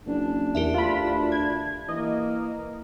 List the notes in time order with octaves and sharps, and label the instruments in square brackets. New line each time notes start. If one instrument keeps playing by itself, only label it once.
[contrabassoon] F#1 [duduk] D4
[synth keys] E2 [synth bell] G4 A#4 E5
[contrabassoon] D2 [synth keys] F4 B5
[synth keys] G#6
[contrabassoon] E3 [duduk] A#3 [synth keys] D#5